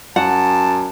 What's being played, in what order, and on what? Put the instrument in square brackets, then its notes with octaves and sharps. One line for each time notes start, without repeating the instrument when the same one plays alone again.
[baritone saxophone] F#2 [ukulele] F#5 [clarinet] A5